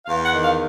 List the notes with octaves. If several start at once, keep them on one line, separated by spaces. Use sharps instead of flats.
E2 F5
F#5
D#3
F5